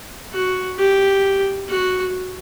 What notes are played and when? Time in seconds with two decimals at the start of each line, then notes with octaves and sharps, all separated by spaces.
0.33 F#4
0.78 G4
1.69 F#4